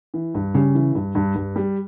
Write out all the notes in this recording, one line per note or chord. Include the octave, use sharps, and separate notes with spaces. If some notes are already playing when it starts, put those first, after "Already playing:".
E3
G2
C#3 G3
E3
G2
G2
G2
G3